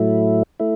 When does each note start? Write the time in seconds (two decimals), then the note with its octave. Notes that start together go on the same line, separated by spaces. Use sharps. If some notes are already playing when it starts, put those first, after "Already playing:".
Already playing: A2 F#3 A3 E4
0.60 A3 E4